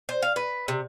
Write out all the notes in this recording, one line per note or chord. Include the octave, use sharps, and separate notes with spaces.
C5
F5
B4
C3